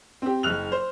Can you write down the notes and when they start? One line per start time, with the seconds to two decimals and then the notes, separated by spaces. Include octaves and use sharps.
0.22 C4 G4
0.43 F#1 F6 F#6 F7
0.72 C5